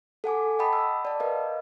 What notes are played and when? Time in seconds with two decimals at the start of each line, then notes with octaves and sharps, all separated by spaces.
0.24 A4 F#5 G#5 D6
0.59 D#5 F#5 G5 A5 B5 D#6
0.73 F#5 E6
1.05 D5 A5
1.20 A#4 B4 D#5 F5